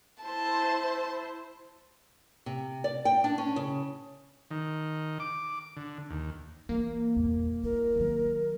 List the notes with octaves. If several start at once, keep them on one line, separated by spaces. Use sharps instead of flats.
E4 C5 A5
C3
D5
G5
D4
C#4
C#3
D#3
D6
D3
D#2
E3 A#3
D#1 E2
E4 A#4
D#3 F#3